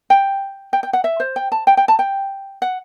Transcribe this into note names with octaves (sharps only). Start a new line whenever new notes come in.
G5
G5
G5
F#5
E5
C5
G5
A5
G5
G5
A5
G5
F#5